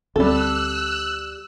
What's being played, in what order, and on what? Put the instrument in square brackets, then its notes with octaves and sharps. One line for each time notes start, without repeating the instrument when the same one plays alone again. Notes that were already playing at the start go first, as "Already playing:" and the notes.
[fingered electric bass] D2 C4 [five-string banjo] G3 A4 [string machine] E6 F#6